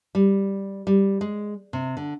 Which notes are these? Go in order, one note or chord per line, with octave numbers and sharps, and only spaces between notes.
G3
G3
G#3
C3
D3